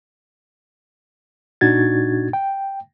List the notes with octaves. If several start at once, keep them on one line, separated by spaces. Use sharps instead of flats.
A#2 D4 D#4 F#4 G#6 A6
G5